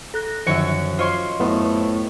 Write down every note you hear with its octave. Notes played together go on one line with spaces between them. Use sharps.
A4 F#6 A#6
F#2 D3 D#3 F3 C5 C#5 E5 C#7
F4 C5 C#5 D#5 C6 C#6
F#2 A2 B3 B4